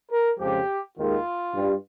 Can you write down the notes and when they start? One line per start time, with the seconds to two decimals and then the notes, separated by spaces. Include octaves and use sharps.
0.10 A#4
0.38 F2 C#3 F3 G#3 G4
0.96 D#2 D#3 G#3 F4
1.53 G2 G3